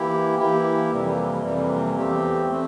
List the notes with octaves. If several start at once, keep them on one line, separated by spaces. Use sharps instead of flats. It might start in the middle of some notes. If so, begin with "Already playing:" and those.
Already playing: E3 A#3 E4 G4
E3 A#3 E4 G4
F2 C3 E3 G3 A#3
F2 C3 E3 G3 A#3
E2 E3 A3 C4 G4
E3 A3 C4